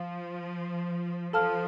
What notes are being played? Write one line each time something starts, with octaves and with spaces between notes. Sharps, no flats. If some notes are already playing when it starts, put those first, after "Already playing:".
Already playing: F3 F5
F3 A4 F5 A5 F6